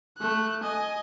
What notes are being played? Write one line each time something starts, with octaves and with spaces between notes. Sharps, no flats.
A3 F#6
D#5 G#5